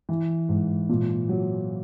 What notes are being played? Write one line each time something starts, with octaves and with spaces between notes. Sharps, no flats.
E3
G#2
A#2
F#3